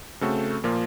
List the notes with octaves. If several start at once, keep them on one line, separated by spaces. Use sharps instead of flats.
C#3 A3 C4 F#4 A4
A#2 F3 A#3 F4